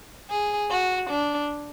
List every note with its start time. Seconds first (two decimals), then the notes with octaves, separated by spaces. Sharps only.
0.30 G#4
0.70 F#4
1.10 D4